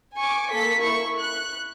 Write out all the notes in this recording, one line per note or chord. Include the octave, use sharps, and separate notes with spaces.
G#5 C#6 D6
A#3 A4 B6
E4 C#6
F#6